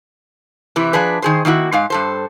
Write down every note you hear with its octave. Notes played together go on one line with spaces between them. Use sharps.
C3 E3 E4
F3 D4 G#4 B4
D#3 G#4 C5
D#3 A#3 E4 F#4
G#2 G#3 F5
G2 A4 C5